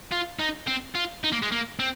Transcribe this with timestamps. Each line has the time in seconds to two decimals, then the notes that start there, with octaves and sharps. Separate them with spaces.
0.12 F4
0.39 D#4
0.67 C4
0.95 F4
1.24 D#4
1.32 A#3
1.42 G#3
1.52 A#3
1.79 C4